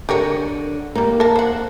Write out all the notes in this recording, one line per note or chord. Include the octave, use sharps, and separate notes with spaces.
D3 G4 A#4 C#5
G3 A#3 D#4
A#4 A5
C5 F#5